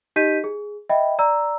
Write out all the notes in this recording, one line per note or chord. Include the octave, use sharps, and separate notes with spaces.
D#4 G4 D#5 G6 B6 D#7
G#4
D#5 E5 G5 B5
D5 A#5 E6